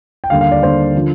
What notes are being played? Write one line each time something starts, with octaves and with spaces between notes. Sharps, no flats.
G5
D#2 D3 G3 F5
F5
D5
D#2 D3 G3 C5
D3 F3